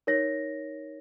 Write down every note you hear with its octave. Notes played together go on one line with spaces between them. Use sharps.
D#4 A#4 C#5 A#6